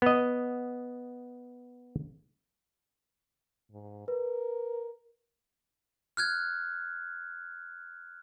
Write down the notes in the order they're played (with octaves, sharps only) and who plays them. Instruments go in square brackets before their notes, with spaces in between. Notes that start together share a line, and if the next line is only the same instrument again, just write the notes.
[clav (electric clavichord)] B3 D#5
[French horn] G#2
[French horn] A#4 [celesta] B4
[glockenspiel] F6 F#6 G#6